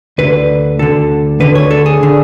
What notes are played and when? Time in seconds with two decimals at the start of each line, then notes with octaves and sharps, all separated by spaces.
0.18 D2 D3 B4
0.79 D2 D3 A4
1.40 D2 D3 B4
1.55 C#5
1.71 A4
1.86 G#4
2.03 D3